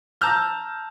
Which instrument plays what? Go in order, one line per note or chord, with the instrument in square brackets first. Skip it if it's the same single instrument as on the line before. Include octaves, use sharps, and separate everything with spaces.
[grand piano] A5 A#5 E6 F6 G6